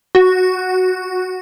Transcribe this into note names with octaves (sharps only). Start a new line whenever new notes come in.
F#4